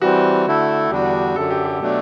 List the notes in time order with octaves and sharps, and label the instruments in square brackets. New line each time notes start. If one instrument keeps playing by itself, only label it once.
[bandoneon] E3 G3 C4 [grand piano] F#4
[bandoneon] D3 A3 E4 A4
[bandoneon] E2 D3 G3 D4 F#4 [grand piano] G4
[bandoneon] F#2 D3 F#3 [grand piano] A4
[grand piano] G4
G4
[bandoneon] B2 F#3 A3 D4